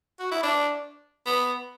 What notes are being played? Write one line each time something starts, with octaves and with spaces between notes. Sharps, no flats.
F#4
E4
D4
B3